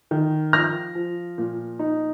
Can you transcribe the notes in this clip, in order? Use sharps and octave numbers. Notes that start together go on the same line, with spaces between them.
D#3
F3 F6 A#6
F3
A#2
D#4